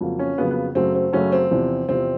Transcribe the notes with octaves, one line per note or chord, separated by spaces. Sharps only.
F2 C#3 F#3 A#3
C#4
F2 C#3 F#3 A#3 B3
B3
F#2 C#3 F#3 A3 C4
C4
F#2 C#3 F#3 A3 C#4
C4
E2 C3 F3
E2 C3 F3 C4